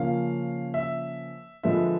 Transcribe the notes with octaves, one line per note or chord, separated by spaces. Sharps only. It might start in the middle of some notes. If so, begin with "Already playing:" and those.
Already playing: C#3 F3 A#3 C#4 F5
E5
D3 F3 G#3 B3 D4 E5